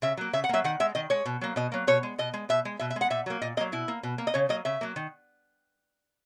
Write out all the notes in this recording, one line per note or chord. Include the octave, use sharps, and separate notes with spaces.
C#3 E5
F#3 A#3
C#3 E5
F#5
F#3 A#3 E5
D#3 F#5
G#3 E5
D#3 D#5
G#3 C#5
B2
F#3 A#3
B2 D#5
F#3 A#3
B2 C#5
G#3
B2 D#5
G#3
B2 E5
G#3
B2 E5
E5
G#3
F#5
A#2 E5
F#3 A#3
A#2 D#5
F#3 A#3 D#5
B2 E4
A#3
B2
A#3
D#5
C#3 C#5
F#3 A#3 D#5
C#3 E5
F#3 A#3
D#3